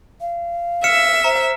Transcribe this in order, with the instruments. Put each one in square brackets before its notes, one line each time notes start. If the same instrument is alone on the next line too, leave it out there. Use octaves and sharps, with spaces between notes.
[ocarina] F5
[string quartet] E5 [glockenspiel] F6 C#7 E7
[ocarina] C5 [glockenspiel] A#5